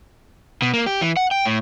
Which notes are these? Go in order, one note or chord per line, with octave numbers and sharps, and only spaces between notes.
B2
A#3
G4
E3
F#5
G5
A2